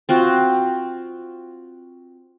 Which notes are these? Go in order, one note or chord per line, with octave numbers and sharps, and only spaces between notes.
C4 F4 F#4